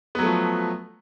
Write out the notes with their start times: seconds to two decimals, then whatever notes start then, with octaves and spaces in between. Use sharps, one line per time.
0.15 B3
0.19 F#3
0.22 A3
0.26 F3